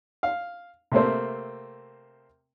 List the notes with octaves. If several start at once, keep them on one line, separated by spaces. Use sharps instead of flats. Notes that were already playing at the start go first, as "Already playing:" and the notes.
F5
C3 A3 A#3 C4